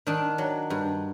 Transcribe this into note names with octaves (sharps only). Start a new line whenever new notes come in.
D#3 D4
F#3
G2